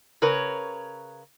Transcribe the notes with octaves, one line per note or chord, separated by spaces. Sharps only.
C#3 A#4 B4 C#5